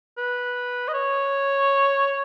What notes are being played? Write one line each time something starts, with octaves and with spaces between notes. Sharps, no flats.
B4
D#5
C#5